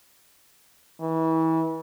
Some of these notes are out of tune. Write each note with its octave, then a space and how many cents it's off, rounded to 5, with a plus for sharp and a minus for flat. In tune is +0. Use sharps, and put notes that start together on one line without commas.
E3 -30